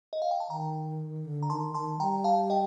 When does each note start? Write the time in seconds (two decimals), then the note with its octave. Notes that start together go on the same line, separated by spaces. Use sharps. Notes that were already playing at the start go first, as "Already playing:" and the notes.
0.13 D#5
0.22 F5
0.31 G5
0.40 A5
0.49 D#3 G5 A#5
1.25 D3
1.43 A#5
1.50 D#3 A5 C6
1.74 D#3 A5 C6
2.00 G3 G5 A#5
2.24 F5 A5
2.50 D#5 G5